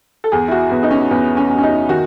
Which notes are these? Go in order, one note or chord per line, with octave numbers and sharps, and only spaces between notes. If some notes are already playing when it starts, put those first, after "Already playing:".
A4
E2 G#4
E4
F#4
E2 B3
D#4
C#4
E2 B3
C#4
E2
C#4
D#4
D#3 F#4